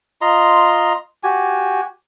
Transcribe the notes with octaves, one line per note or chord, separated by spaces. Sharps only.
F4 D#5 A#5 C6
F#4 G4 G#5